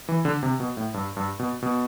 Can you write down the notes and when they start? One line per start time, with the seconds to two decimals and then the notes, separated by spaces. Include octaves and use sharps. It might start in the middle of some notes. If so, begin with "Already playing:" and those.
0.08 E3
0.25 D3
0.43 C3
0.60 B2
0.77 A2
0.94 G2
1.17 G2
1.39 B2
1.62 B2